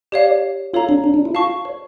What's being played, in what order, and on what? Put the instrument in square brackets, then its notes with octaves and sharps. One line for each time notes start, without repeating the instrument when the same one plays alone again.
[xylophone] G4 C#5 F5 [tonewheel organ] D5
[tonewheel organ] F4 [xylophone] A4 C#5 F5 A#5
[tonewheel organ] D4
D4
D4
E4
[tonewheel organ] F4 [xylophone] F5 A5 C#6
[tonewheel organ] C#5